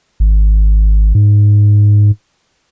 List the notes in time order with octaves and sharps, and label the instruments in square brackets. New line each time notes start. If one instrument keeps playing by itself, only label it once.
[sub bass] G#1
G#2